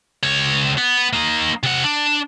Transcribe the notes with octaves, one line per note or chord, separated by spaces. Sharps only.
C#2 C#5
B3
A#3 D#4
C3 F#5
D4